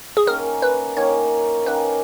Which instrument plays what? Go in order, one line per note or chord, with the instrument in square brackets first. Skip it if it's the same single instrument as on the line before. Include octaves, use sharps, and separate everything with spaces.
[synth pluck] G#4
[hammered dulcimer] D#3 A#3 C#4 [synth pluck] A#4
[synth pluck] B4
[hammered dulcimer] D#3 A#3 C#4 [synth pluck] C#5
[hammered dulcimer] D#3 A#3 C#4 [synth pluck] B4